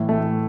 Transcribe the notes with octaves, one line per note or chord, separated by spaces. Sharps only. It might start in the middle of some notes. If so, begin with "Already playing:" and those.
Already playing: A2 E3
A3